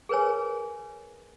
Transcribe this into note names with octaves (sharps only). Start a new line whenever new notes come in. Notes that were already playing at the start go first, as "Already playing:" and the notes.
G#4 A#4 B4 C#5 G#5